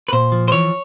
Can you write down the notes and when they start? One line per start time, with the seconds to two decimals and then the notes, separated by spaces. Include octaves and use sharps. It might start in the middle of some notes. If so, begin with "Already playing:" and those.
0.08 B4
0.13 A#2 C5
0.32 F3
0.48 C5
0.52 E3 C#5